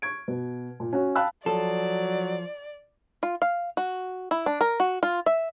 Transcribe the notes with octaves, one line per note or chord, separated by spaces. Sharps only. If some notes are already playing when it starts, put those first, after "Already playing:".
C#6 G#6 D7
B2
A#2
C#4 F#4
F5 G5 A5 B5 E6 F#6
F3 F#3 A4 D5
F4
F5
F#4
E4
D4
A#4
F#4
F4
E5